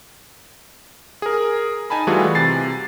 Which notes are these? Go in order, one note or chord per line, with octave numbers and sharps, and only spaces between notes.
G#4 A#4
D#4 G#5 A5 B5
E3 G3 A3 F4 F#4 G#4
C3 A6 C7